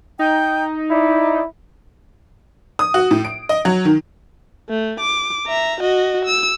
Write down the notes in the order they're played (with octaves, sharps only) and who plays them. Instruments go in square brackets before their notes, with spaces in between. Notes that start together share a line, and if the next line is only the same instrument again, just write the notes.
[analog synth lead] D#4 [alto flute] G5
[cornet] E4 [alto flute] D5
[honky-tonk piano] D#6
F#4
A2
D7
D#5
F#3
D#3
[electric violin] A3
D6
E5 A#5
F#4 D#5
E6